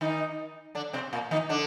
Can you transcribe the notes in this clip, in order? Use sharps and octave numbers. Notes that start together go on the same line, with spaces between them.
D#3 D#4
D3 D4
C3 C4
A#2 A#3
D#3 D#4
D3 D4